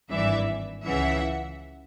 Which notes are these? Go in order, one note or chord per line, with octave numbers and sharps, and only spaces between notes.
G#1 G2 E3 D5 E5
C#2 C#3 E3 E5 F#5